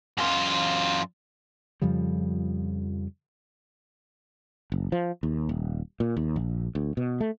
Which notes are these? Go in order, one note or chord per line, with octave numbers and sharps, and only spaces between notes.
F#2 F4
F2 C#3 F3 G3
F#1
F3
D#2
D#1
A#2
D#2
A#1
D2
B2
A3